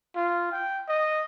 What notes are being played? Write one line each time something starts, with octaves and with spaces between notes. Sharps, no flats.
F4
G5
D#5